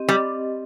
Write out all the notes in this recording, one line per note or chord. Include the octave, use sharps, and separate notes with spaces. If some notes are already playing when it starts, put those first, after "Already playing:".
Already playing: C4 G4 D#5
G3